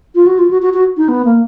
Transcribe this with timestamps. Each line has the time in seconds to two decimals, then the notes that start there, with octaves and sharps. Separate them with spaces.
0.15 F4
0.27 F#4
0.39 F4
0.51 F#4
0.62 F#4
0.74 F#4
0.97 D#4
1.09 B3
1.25 A#3